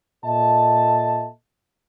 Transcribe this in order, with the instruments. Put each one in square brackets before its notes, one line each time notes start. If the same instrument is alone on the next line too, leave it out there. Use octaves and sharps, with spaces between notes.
[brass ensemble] A#2 A4 D#5 E5 A5